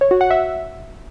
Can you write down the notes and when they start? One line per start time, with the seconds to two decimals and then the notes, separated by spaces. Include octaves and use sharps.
0.01 C#5
0.11 F#4
0.21 F#5
0.31 E5